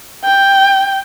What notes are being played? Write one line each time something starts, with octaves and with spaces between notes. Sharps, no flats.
G5